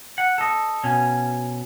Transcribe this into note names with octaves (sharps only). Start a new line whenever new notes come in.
F#5
A4 D#5
B2 C#4